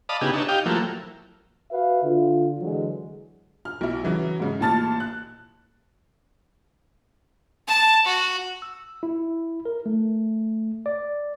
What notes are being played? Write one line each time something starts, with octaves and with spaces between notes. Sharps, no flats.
D5 D#5 F5 A5 B5 D#6
C#3 B3 D#4 E4 G4 G#4
D4 D#4 C#5 E5
G4 D#5 F5 G5
F3 F#3 A3 A#3 E4
F#4 B4 E5 F5
D3 F4
D3 E3 F#3 G#3
F6
B1 E4
C#3 E3 F#3
G#2 C#3
A1 A#2 A5 F6 A6
F#6
A5
F#4
E6
E4
A#4
A3
D5